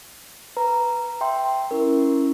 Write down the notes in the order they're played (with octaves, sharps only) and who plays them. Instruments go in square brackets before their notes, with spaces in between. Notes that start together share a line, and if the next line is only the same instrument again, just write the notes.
[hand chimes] B4 A#5
E5 G5 C6
[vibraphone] C#4 E4 [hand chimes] A#4